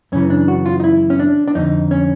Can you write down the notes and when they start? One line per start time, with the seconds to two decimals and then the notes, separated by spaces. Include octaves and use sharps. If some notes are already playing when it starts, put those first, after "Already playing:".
0.12 F#2 C#3 E3 C#4
0.30 D4
0.48 F#4
0.66 F4
0.80 D#4
0.84 E4
1.10 C#4
1.19 D4
1.48 D4
1.55 F2 D3 D#4
1.91 C#4